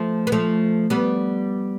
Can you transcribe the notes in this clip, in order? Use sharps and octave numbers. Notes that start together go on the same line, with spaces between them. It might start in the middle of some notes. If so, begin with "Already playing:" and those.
Already playing: F3 A3
B3
F3 A3
G3 B3